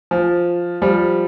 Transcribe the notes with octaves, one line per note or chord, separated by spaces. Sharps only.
F3
F3 G3